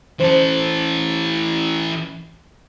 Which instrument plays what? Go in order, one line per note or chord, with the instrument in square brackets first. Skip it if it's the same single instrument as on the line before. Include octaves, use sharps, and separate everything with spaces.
[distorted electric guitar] E3 A4 [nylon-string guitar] C#4 C5